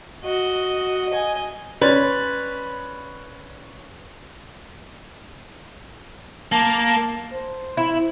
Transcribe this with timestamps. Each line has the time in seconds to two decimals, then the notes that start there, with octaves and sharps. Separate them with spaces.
0.23 F#4 D#5
1.09 D#5 G#5
1.82 C#4 B4 D5 C6 A6
6.52 A#3 A5
7.33 C5
7.77 E4